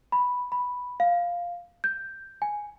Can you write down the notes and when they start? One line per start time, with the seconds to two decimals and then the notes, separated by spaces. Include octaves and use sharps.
0.12 B5
0.52 B5
1.00 F5
1.84 G6
2.42 G#5